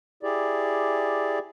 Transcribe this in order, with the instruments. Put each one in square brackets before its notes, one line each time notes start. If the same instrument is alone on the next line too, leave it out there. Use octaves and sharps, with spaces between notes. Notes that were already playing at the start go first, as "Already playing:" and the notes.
[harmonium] E4 G4 G#4 D5